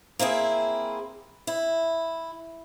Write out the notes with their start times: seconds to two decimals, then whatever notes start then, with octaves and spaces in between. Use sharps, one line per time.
0.19 A#3 C4 E4 G#4
1.47 E4